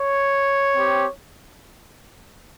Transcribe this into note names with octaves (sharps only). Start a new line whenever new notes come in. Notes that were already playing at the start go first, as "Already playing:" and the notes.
Already playing: C#5
C4 G4